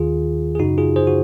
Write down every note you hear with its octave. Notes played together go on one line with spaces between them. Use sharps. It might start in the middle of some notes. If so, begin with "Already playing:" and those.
Already playing: D#2 D#3 F4 G#4
G#4
F#2 C#3 D#4 F#4
F4 G#4
G#4 C5
F#4